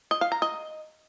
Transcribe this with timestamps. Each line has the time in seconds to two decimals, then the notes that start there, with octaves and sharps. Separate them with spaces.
0.11 D#5
0.21 F5
0.32 A#5
0.42 D#5